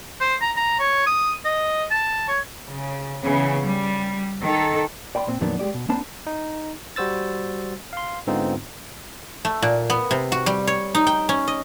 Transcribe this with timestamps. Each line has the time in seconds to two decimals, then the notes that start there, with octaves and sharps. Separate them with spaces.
0.21 C5
0.41 A#5
0.57 A#5
0.79 C#5
1.07 D#6
1.45 D#5
1.91 A5
2.28 C#5
2.66 C#3
3.23 C#3 E3 B3
3.62 G3
4.42 D#3 A4
5.15 D5 G5 B5 C6
5.28 A#2 C4
5.41 F2 A#2 D#3 F#3 B3 D4
5.59 G#3 G4 D5
5.74 B2
5.89 A#3 C4 D4 C5 A5 B5
6.27 D#4
6.96 G3 F#4 C5 E6 A6
7.93 F5 C6
8.27 G#2 D3 B3 C4 D#4 F4
9.45 A3
9.62 A#2
9.90 B3
10.11 C3
10.32 F#4
10.46 G3
10.67 C#5
10.95 D#4
11.07 G5
11.29 C#4
11.48 D#5